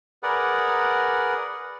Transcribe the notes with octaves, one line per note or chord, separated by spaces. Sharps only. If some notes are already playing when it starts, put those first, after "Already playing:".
G#4 A#4 B4 D5 F#5